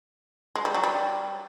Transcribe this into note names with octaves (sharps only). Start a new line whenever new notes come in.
G#3
G3
F#3
G3